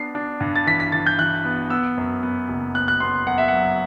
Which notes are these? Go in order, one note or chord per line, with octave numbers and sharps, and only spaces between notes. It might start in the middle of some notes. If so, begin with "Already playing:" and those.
Already playing: B3 D4 C7
D4
G2
A6
E3 B6
B6
E3 A6
G6
E3 F#6
B3
B3 E6
F#2
B3
F#1
B3 F#6
F#6
B3 C6
F#2 F#5
E5
F#5
F#3